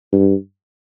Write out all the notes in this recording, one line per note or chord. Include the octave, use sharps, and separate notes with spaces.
G2